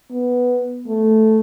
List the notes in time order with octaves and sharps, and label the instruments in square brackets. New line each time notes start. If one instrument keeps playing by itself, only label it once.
[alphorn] B3
A3